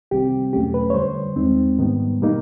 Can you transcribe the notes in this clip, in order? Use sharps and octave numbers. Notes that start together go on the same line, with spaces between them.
C2 C3 D#3 G3 C4 G4
E2 B2 F#3 A3 C#4 G4
B4
C#5
F#2 D3 G3 C5
D#2 D#3 G#3 C4 D#4
G#2 D#3 G3 B3
B2 G3 A#3 D#4